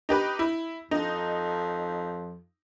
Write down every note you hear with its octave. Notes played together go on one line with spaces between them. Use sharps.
D#4 G4 B4
E4
F2 D#4